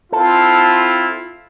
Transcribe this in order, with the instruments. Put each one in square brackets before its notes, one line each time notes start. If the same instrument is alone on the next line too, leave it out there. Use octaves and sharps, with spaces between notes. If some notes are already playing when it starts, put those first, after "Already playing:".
[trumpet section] C4 E4 F4 [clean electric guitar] A4